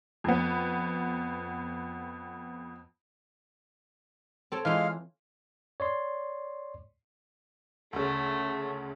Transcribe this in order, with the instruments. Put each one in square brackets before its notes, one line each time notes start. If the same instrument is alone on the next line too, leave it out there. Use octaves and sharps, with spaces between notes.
[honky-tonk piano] F2 B3
[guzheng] C4 A4 C#5
[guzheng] E3 F4 [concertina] G#3 F5
[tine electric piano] C#5 D5 C6
[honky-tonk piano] D2 C#3 [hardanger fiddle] A3